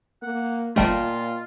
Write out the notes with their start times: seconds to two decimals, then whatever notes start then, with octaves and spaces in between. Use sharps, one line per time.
0.23 A#3 F#5
0.76 G1 A#2 G3 A3 F4 D#5 G5 A5